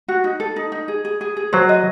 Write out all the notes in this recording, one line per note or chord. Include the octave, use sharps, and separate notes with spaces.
F#4
D#4
A4
D#4
D#4
G#4
G#4
G#4
G#4
F#3 C5
D#5